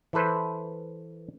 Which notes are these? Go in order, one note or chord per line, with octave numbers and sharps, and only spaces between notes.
E3 E4 A4 B4 C5